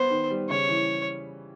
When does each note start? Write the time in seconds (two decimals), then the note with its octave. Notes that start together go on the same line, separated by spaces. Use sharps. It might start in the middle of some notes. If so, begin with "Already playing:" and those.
Already playing: B3 C5
0.11 D#3
0.31 G3
0.49 C#3 C#5
0.69 E3